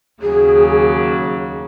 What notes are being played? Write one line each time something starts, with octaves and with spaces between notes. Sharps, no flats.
D#2 C#3 F#3 G#4